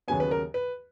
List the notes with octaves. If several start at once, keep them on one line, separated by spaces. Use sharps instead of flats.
D#2 C#3 F#3 B3 G#5
B4
A#4
B4